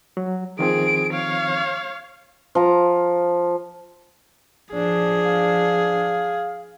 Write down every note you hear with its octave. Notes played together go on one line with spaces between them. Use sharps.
F#3
D#3 F3 C4 G#4 D7
C#5 F5
F3 A#5
F3 D4 G#4
F5